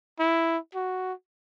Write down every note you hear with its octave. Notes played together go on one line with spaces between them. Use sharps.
E4
F#4